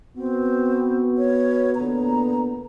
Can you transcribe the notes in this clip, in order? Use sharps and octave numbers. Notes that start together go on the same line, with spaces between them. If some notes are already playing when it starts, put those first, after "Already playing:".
B3 C4 F#4
C#5
A#2 D3 B3 A#5